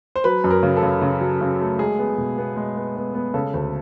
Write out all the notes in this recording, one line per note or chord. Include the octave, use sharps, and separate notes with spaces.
C5
F#3 B4
F#2
A#4
C#3
A4
C#3
C#3
F#3
C#3
A3
G#3 G#4
B3
B2
B3
G#3
B3
B3
B3
C#3 A4
D2